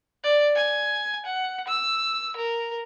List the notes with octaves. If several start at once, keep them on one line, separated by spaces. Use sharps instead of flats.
D5
G#5
F#5
E6
A#4